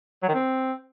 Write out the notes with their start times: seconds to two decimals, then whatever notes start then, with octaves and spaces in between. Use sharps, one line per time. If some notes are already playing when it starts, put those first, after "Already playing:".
0.23 F#3
0.28 D#3
0.34 C4